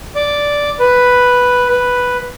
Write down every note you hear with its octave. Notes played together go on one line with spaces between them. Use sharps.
D5
B4
B4